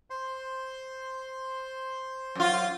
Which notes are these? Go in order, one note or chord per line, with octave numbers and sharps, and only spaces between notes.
C5 C6
F#2 F4